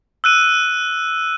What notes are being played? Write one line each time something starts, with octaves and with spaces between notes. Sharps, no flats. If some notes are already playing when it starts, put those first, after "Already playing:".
E6 F#6 D#7